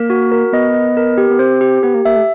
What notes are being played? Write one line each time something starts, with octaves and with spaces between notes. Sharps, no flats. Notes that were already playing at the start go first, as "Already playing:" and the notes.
Already playing: A#3 A#4
F#4
A#4
B3 D#5
D#5
A#4
G4
B3
C4 C5
G4
B3 G4
A#3
A#3 E5
A3